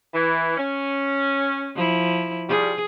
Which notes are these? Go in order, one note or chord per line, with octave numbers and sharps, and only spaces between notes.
E3
C#4
F3 E4
F3 G3 G#4